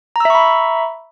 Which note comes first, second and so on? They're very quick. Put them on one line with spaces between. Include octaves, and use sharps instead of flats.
A#5 E6 E5 C#6 B5